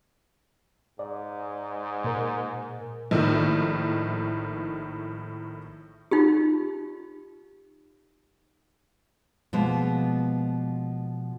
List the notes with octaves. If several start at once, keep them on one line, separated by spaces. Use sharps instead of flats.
G#2 D5
A#2 A#4
A#1 A2 D#3
D#4 F4 G4
B2 F3 G#3 A#3